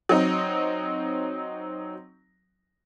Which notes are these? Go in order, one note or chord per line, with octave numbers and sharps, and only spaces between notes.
F#3 C4 D#4